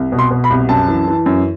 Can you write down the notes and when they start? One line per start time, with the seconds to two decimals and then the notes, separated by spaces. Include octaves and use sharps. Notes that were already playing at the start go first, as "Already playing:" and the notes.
Already playing: C2
0.12 B2
0.19 C6
0.31 B2
0.44 B5
0.50 C2
0.69 F#2 A5
0.88 E3
1.07 E3
1.26 F#2